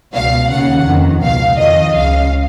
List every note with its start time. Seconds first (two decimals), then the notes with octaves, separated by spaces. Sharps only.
0.14 C#2 B2 F5
0.50 D#2 C#3 F#5
0.86 F2 D#3
1.22 C#2 B2 F5
1.58 F2 D#3 D#5
1.94 C#2 C#3 F5